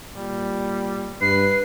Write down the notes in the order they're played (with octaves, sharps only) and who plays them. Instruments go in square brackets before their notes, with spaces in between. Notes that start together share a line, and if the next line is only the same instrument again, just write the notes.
[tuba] A#2 [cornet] G3
[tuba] G2 [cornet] B4 [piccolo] C7